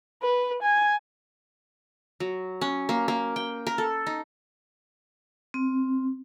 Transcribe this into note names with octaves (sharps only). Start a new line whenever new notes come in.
B4
G#5
F#3
C#4
A#3
A#3
G5
A#4
A4
D#4
C4